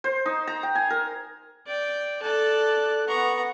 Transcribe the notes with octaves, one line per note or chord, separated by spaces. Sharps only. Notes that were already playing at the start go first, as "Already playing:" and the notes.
C5
D#4
A#5
G5
G#5
A#4
D5 G5
A4 D5 A5 F#6
B3 F#5 A#5 C#6